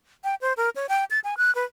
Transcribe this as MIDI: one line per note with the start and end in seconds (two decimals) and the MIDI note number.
0.24 0.35 79
0.41 0.53 72
0.57 0.70 70
0.76 0.86 73
0.89 1.05 79
1.11 1.20 93
1.24 1.35 80
1.37 1.53 90
1.55 1.64 71